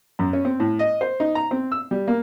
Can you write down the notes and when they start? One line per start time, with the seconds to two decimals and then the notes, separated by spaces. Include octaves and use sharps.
0.19 F#2
0.33 C#4
0.45 C4
0.60 A2
0.79 D#5
1.01 C5
1.20 D#4
1.35 A#5
1.51 C4
1.72 E6
1.91 G3
2.08 A#3